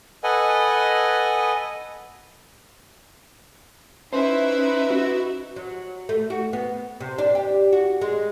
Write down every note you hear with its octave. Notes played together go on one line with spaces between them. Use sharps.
A4 B4 D#5 F#5 G#5
C#4 D#4 E4 B4 C5 E5 C6
F#4
F#3
A3
F#4
B3
C3
D4
G4
F#4
G#3